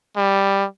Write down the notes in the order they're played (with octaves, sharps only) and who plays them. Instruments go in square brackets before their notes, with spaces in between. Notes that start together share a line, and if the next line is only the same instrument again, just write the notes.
[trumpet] G3